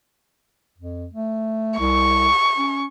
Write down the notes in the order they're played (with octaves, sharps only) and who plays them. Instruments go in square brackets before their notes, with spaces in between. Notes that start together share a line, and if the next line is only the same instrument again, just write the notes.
[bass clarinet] F2
A3
[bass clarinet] C2 [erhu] C#6
[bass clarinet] C#4